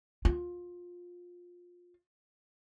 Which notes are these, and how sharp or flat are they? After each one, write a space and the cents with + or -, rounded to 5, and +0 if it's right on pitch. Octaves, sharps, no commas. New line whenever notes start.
F4 +20